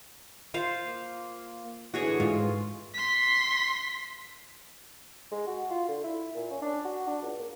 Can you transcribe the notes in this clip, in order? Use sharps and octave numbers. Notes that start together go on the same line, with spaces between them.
F4 C5 F5
A#3
A2 D3 E3 F#4 G#4 C#5
G#2 F4
C6 B6
G#3
F#4
F4
D3
E4
A#2
C#4
D4
F#4
D4
C#2
A#3